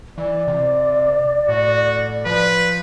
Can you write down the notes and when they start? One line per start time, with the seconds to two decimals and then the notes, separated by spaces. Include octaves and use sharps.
0.18 E3 D5
0.48 C3
1.49 A2 F#4
2.26 F3 B4